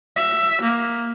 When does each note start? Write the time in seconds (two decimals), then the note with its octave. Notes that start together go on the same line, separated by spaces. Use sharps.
0.16 E5
0.62 A#3